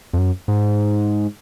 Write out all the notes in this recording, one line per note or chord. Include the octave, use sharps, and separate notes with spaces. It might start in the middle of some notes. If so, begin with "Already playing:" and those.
F2
F#2
G#2